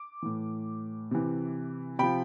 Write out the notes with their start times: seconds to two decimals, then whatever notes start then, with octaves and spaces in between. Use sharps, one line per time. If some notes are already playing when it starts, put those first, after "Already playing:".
Already playing: D6
0.22 A2 E3
1.11 C3 E3
1.99 C3 F3 G5 B5